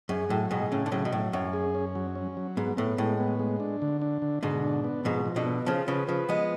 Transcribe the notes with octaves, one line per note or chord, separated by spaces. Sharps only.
F#2 G#4
A2 F#3
G#2 B2 G#4
A2 C#3 C#4
D3
A2 C#3 F#3
B2
A2 F#3
F#2 C#4
G#4
C#4
F#3
C#4
F#3
G#2 B3
A2 B3
A2 G#3
B3
G#3
D4
D3
D4
D3
G#2 B2 D3
D4
B3
G#2 B2 F3
F3
B2 D3
B3
C#3 F3 F4
C#3 F3 B4
C#3 F3 B4
F3 G#3 B3